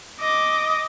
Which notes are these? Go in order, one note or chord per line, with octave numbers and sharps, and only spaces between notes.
D#5 D6